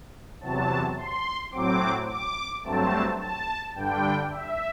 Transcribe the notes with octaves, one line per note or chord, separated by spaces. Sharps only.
E2 C3 F#3 A5
C6
A2 F#3 C4 D6
D6
G2 F#3 A3 C4 A5
A5
G2 D3 G3 D4 G5
E5